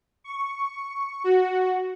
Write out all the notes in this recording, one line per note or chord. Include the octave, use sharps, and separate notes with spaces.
C#6
F#4